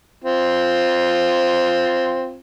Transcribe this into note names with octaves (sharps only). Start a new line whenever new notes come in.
C4 F4